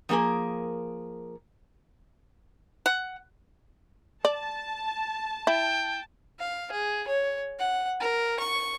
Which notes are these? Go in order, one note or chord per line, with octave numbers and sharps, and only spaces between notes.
F3 F#3 A#3 G#4 A#4
F#5
D5 A5
E4 G5
F5
G#4
C#5
F#5
A#4
C#6